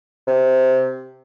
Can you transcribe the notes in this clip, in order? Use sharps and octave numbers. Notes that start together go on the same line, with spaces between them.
C3